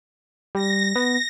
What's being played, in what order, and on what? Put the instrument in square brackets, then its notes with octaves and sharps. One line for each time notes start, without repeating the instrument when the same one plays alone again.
[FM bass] G3 [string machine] A#6
[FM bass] B3